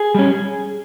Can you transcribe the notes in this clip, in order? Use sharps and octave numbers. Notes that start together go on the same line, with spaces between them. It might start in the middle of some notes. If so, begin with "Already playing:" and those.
Already playing: G#4
G3 C#4